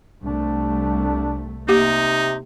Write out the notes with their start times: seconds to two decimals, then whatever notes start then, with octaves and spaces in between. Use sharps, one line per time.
0.24 C2 A3 D4
1.69 C3 A#3 D#4 G4